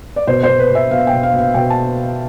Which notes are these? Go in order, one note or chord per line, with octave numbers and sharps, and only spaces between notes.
D5
B2 C5
C5
B2
B4
B2 E5
B2 F5
G5
B2
F5
B2 F5
B2 G5
A5